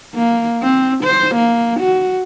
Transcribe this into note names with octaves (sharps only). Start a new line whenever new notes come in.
A#3
C4
C5
A#3
F#4